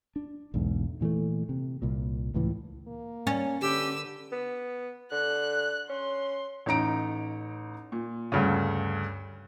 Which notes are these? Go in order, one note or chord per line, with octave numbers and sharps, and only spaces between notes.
D4
B1 E2 G#2
A#2 E3 F#3 A3
C3
C2 A#2
C#2 A2 E3
A#3
C#4
D3 G4 B4 E6
B3
D3 F#6
C#4 C6
A1 D#4 A#5 D7
A#2
D2 G2 C#3